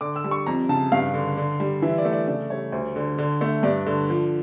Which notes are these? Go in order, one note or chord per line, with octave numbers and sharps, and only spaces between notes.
D3 D6
E6
G3
C#6
F2 A#5
C#3 A5
G2 F5
D3
D3
G3
E3 E5
D5
A3
D5
C#3 D5
G3 C#5
D2
D3
D3
A3
G2 D5
D3
F3